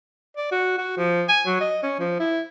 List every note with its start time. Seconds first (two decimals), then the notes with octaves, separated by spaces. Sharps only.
0.37 D5
0.51 F#4
0.78 F#4
0.97 F3
1.29 G#5
1.46 F#3
1.60 D#5
1.83 C#4
1.99 F3
2.19 E4